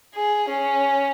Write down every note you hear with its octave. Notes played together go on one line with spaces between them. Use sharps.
G#4
C#4